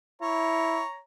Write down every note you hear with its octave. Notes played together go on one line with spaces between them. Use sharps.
E4 C#5 A#5